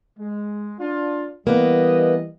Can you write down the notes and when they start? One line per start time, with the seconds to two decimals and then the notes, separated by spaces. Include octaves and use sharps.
0.18 G#3
0.79 D4 F4
1.47 E3 G3 A#3 B3 D#5